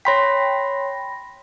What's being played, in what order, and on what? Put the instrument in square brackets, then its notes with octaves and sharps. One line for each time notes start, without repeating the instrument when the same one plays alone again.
[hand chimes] C#5 C6 B6 [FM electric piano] G5 B5 A#6